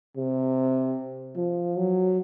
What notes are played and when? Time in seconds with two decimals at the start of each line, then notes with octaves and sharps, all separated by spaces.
0.17 C3
1.36 F3
1.77 F#3